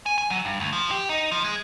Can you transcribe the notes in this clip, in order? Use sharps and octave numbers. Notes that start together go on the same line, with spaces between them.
G#5
G#5
F#3
G2
D2
F3
G4
D#4
F3
G#3